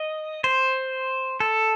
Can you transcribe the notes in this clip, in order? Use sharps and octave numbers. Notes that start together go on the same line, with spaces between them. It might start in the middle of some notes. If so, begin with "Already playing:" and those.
Already playing: D#5
C5
A4